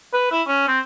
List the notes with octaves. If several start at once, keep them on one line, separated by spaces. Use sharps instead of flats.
B4
E4
C#4
C4